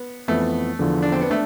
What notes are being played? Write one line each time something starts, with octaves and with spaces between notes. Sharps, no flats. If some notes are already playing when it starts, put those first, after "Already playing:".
Already playing: B3
F2 E3 A3 B3
E2 D3 F3
D4
C4
B3
A3 D4